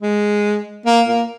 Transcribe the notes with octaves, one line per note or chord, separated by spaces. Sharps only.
G#3
A#3
A#3